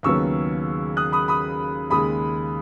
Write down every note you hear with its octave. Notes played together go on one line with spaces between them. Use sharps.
D#2 C#3 F#3 B3 C#6 E6
D#6 F#6
B5 D#6
B5 D#6
D#2 C#3 G#3 B5 D#6